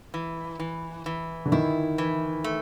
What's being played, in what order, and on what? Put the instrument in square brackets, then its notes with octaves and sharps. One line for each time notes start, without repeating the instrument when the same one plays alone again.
[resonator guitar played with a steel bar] E3
E3
E3
[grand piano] D3
[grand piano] D#3 [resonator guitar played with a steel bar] E4
[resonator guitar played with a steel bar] E3
A3